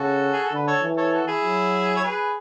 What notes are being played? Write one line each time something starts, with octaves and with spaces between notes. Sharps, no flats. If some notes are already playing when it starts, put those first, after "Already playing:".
Already playing: C#3 F#4 A4
G#4
A4
D3 B4
A4 C#5
E3
A4 C#5
F#4 A4
E4 G#4
F#3
C#5
G#4 B4